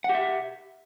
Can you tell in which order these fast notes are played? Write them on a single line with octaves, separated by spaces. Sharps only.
F#5 G4 E5